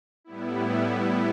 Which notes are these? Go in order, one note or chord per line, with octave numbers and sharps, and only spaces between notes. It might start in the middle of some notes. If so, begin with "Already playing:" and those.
A2 G3 B3 E4